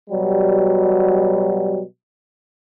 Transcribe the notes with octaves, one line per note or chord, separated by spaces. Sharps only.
B2 F#3 G3